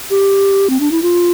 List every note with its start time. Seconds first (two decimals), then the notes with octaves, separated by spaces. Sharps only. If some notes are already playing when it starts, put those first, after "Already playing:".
0.10 G4
0.70 C4
0.80 D4
0.91 E4
1.02 F4